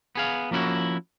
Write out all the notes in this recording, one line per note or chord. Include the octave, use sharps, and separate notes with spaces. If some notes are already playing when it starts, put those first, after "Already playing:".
B3 G#4 F5
F3 A#3 C#4 E4 F#4